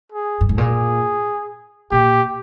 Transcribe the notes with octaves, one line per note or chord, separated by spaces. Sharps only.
G#4
G2
G#2
A#2 G#4
A#2 G4